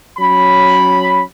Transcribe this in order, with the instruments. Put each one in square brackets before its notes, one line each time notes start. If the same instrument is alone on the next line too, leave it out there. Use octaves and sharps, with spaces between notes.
[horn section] F#3 C#4 B5